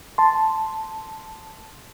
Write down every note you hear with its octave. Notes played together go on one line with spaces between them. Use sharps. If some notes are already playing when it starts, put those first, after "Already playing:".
A5 C6